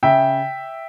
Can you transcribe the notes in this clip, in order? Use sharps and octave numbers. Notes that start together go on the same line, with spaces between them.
C#3 E5 G5